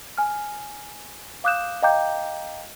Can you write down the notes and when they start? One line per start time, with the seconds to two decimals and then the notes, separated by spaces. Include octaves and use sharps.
0.17 G#5 F6
1.44 F5 D6 D#6 F#6 G6 E7
1.82 D#5 F5 G5 A#5 D6 G6